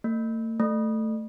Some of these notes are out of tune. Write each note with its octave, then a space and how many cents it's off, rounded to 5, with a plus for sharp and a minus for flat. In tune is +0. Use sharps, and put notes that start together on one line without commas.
A3 +45
A3 +5